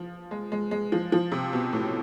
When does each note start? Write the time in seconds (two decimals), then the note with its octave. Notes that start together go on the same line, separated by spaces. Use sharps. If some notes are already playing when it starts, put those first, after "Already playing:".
Already playing: F3
0.31 G#3
0.52 G#3
0.71 G#3
0.92 F3
1.12 F3
1.32 C3
1.53 B2
1.73 A2